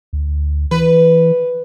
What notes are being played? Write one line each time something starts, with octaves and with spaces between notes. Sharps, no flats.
D2
E3 B4